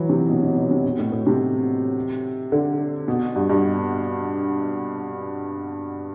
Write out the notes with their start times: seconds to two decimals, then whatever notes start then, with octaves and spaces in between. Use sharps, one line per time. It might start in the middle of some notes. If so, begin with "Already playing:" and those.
Already playing: E3 F#3
0.09 C3
0.29 B2
0.43 B2
0.57 B2
0.71 C3
0.84 B2
0.99 A2
1.12 A2
1.27 C3
2.52 D3
3.08 B2
3.36 G2
3.50 G2